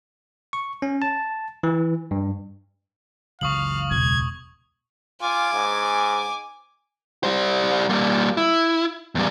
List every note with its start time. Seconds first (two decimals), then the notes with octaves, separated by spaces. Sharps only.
0.53 C#6
0.82 C#4
1.02 A5
1.63 E3
2.11 G2
3.41 F#1 C#2 E3 F5 C#6 D#6 F#7
3.91 E1 G#6
5.21 F4 G#5 D6
5.54 G#2
7.24 G3 C5
7.89 G3 A#3
8.37 E4
9.15 E2 G3